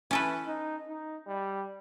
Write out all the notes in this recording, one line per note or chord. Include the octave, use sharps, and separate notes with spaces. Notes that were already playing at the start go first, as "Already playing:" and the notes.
E3 C#4 A4 B4
D#4
D#4
G3